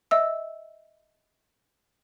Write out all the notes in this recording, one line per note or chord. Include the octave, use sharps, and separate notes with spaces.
D#5 E5 E6